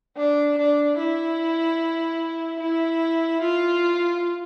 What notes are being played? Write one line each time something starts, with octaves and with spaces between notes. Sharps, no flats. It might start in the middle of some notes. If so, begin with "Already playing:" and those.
D4
D4
E4
E4
F4